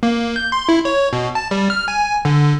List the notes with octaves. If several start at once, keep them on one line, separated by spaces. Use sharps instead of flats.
A#3
G6
C6
E4
C#5
B2
A5
G3
F6
G#5
D3